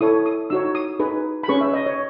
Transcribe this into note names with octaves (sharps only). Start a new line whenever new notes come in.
E4 A4 C#5 D#6
D#6
D#4 F#4 C#5 E6
D#6
D#4 G#4 B4
B5
C#4 G#4 B4 C#6
E5
D#5
C#5